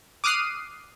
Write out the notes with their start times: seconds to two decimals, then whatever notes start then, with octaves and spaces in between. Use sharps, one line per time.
0.24 D6 D#6 F6 F#6 C7 D#7